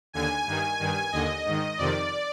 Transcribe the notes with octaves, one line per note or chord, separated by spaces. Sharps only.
D#2 D3 G#5
G2 D#3
G2 D#3
D#2 D3 D#5
G#2 D#3
F2 C3 D#3 D5